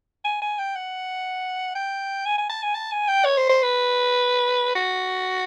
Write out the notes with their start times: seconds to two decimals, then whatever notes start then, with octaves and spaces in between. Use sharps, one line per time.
0.25 G#5
0.42 G#5
0.59 G5
0.76 F#5
1.75 G5
2.25 G#5
2.38 G#5
2.50 A5
2.63 G#5
2.75 A5
2.92 G#5
3.08 G5
3.25 C#5
3.38 C5
3.49 C5
3.63 B4
4.75 F#4